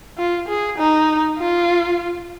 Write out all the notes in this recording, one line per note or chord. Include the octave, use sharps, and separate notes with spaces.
F4
G#4
D#4
F4